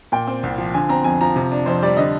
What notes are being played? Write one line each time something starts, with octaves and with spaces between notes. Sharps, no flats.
A#2 G5
C4
C2
F3
D3 G#5
C4 A#5
F2 G#5
F3 A#5
C3
D4
F2 C5
G3 D5
D3 D#5